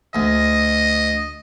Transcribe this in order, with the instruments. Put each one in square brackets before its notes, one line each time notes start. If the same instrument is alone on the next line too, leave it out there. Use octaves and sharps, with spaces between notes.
[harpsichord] D2 [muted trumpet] D#5